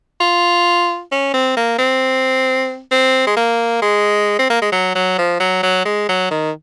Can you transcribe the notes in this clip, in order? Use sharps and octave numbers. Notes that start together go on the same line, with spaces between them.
F4
C#4
C4
A#3
C4
C4
G#3
A#3
G#3
C4
A#3
G#3
F#3
F#3
F3
F#3
F#3
G#3
F#3
D#3